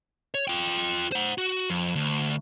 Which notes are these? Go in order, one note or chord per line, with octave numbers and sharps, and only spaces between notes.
C#5
F4 G5
C5 F#5
F#4
F2
D2